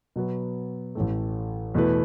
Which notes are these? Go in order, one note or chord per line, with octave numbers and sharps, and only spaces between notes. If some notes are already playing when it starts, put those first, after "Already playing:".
B2 F#3 B3
A1 A2 A3
E2 B2 A3 E4 B4